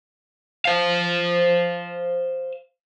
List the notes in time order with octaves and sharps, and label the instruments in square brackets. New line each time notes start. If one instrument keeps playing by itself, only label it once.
[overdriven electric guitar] C5 F5